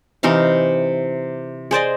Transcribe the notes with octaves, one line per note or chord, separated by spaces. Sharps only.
C3 E3 D#4 F5
G#4 C5 D5 D#5